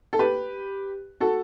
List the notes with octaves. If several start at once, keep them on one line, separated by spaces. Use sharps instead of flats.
A4
G4 B4
F#4 A4